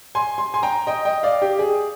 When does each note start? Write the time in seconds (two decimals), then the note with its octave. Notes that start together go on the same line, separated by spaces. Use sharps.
0.15 G#5 C6
0.38 C6
0.54 G#5 C6
0.63 G5 A#5
0.87 D#5 G5
1.05 D#5 G5
1.23 D5 F5
1.42 G4
1.59 G#4